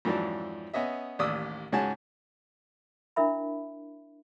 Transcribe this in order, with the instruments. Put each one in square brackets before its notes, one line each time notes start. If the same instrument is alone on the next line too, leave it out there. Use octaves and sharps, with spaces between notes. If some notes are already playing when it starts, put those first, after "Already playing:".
[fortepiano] F2 G#2 E3 F#3 D4 A5
B3 C#4 D#5 E5
A1 D#2 D5 D#6 E6
C#2 G#2 C#4 F#4 G#4 A5
[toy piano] D4 E4 A#4 E5 B5